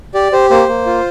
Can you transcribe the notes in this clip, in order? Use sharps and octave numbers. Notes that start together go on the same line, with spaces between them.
G4 D5
G4 C5
A#3 C5
A#3
F4